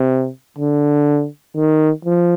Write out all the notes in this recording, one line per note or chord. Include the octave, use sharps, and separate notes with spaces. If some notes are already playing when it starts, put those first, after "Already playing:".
Already playing: C3
D3
D#3
F3